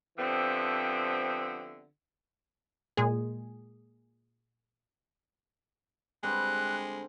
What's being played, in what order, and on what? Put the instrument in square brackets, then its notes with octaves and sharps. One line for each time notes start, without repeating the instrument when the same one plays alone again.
[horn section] D3 F3 B3 C4 G4 E5
[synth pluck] A#2 G#3 G#4
[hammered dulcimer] D3 G3 C4 [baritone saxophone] G#3 [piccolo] F#6